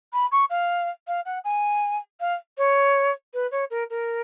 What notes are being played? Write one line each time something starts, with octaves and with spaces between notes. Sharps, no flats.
B5
C#6
F5
F5
F#5
G#5
F5
C#5
B4
C#5
A#4
A#4